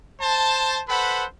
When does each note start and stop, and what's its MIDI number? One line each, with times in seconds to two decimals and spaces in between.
0.21 0.81 72
0.21 0.81 81
0.88 1.24 69
0.88 1.24 71
0.88 1.24 72
0.88 1.24 78
0.88 1.24 83